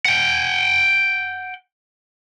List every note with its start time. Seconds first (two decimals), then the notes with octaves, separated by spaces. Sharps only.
0.05 F#5 G5